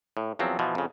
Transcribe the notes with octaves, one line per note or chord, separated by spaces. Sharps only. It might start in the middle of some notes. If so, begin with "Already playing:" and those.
A2
E2 F3 F#3 C4
B2 E3 F3
F2 C#3